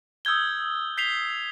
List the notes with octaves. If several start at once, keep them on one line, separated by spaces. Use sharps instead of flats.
D#6 E6 G6 G#6 G7
G6 B6 C7 F7 G7